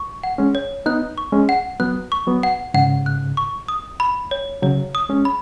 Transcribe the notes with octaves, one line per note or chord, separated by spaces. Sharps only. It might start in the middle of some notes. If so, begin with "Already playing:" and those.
Already playing: C#6
F#5
G#3 C#4
C#5
B3 D#4 F#6
C#6
G#3 C#4
F#5
F#3 B3 F#6
C#6
F#3 B3
F#5
G#2 C#3 F#5
F#6
C#6
D#6
B5
C#5
C#3 F#3 C#5
D#6
G#3 C#4
B5